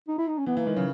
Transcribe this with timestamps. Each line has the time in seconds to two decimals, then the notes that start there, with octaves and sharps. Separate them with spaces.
0.08 D#4
0.18 E4
0.27 D#4
0.38 C#4
0.46 E3 B3
0.56 E3 A#3
0.66 D#3 G#3
0.76 C#3 F#3